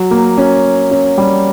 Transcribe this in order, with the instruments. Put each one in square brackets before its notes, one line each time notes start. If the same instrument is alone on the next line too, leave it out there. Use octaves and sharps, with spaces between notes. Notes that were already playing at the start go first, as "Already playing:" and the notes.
Already playing: [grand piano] F#3
A#3
C#4
C#4
G3